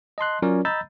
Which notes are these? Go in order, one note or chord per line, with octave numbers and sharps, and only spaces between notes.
D#5 A5 C6 F#6
F#3 C#4 F4 A#4 C#5 D5
D#5 A#5 B5 E6 G6 A6